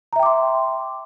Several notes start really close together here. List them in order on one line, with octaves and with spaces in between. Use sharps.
A#5 E5 G5 D6 C6